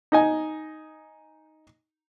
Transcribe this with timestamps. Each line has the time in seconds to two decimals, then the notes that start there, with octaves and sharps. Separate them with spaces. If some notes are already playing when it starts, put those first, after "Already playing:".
0.12 D#4 D#5 G#5